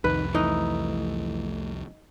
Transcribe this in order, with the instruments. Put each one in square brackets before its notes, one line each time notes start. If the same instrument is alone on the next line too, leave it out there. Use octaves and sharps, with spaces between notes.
[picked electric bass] C2 F2 [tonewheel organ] D#3 D#4 [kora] B4
[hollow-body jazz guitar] E3 [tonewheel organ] A3 [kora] D#4